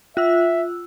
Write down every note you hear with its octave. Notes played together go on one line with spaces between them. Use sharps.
F4 E5 E6